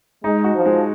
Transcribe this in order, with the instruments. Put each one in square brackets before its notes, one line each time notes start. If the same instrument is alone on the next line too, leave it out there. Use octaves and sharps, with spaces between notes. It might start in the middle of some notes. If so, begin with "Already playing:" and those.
[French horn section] G#3 [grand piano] D#4
[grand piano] F#4
[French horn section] F3
[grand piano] G#3